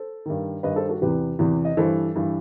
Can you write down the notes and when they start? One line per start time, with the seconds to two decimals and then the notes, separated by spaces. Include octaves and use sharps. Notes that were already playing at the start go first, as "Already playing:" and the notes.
Already playing: A4 C5
0.25 G2 D#3
0.63 G2 D#3 B4 D#5
0.76 A4 C5
0.89 F#4 A4
1.01 E2 C3 E3 G4 B4
1.39 E2 C3 E3
1.65 D#5
1.77 G2 E3 A4 C5
2.16 G2 E3